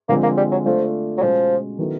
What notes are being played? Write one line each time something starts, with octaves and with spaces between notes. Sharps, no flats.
D3 F3 G#3 A#3 C4
A#3
G3
F#3
F3 A3 D4 F4 A4
F#3
B2 F3 G#3 C#4
D#3 F#3 B3 E4 A4